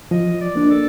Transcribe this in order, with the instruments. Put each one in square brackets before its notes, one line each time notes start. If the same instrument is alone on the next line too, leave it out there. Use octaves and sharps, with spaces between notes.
[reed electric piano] F3 [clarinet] D#5
[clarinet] D5
[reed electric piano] A#3 D4
[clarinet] A4